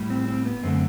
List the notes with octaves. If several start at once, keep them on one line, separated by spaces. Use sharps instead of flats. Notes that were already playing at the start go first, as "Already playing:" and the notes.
Already playing: A2 G3
C4
C4
B3
F#2 D3 A3 C4